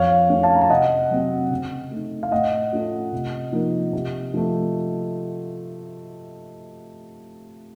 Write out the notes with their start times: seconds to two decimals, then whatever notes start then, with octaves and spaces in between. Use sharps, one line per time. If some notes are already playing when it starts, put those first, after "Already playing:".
Already playing: F2 C#5 F5
0.29 D#3 A3 C#4
0.43 F5 A5
0.54 A#5
0.62 A5
0.70 C3 D#5 F#5
1.11 F#3 C4
1.51 C#3
1.91 A3 D#4
2.23 F5
2.31 A2 D#5 F#5
2.73 A3 C#4 F4
3.12 C3
3.53 F3 A#3 D#4
3.93 C3
4.34 F3 A3